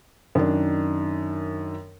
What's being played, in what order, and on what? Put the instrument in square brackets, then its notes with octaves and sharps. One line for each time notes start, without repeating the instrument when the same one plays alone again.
[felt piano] F#2 D#3 D4